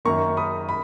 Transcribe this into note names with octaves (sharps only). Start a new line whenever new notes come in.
F#2 D#3 A#3 A#5 C#6
B5 D#6
B5